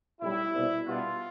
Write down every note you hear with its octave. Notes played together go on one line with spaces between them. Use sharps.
B1 A2 G3 E4
C2 B2 G3
B2 G3 B3 D4 F4